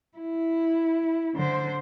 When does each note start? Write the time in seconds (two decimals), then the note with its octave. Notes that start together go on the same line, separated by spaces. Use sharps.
0.18 E4
1.35 D3 C5